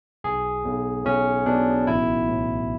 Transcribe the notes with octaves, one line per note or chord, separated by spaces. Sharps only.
B1 G#4
B1
B1 C#4
B2 D4
A1 E4
A2